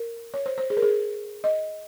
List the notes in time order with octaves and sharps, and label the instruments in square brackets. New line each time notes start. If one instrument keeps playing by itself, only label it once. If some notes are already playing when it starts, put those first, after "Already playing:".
Already playing: [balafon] A#4
C#5
C5
C5
G#4
A#4
G#4
D#5